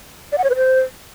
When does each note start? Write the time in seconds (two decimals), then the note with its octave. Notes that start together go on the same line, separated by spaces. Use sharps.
0.32 D5
0.38 F#5
0.44 C#5
0.50 B4
0.56 C5